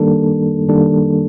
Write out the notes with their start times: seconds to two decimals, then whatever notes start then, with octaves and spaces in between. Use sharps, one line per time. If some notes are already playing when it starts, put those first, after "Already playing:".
Already playing: D#3 G3 A#3 D4 A4
0.69 D#3 G3 A#3 D4 A4